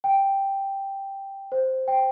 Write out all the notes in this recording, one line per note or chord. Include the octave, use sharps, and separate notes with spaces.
G5
C5
G5